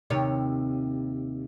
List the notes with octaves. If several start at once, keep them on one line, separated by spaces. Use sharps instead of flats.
D#2 C3 C#5